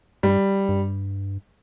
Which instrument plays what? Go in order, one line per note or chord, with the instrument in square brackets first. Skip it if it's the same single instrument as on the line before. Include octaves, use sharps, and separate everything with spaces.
[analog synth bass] G2 [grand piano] G3
[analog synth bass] G2